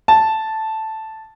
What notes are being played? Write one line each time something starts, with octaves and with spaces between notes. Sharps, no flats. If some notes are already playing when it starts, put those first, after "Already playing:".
A5